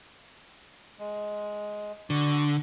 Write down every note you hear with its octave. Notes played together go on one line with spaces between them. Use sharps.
G#3
D3 F#4